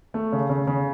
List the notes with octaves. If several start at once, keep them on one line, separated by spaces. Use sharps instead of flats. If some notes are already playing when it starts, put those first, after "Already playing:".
A3
C#3
C#3
C#3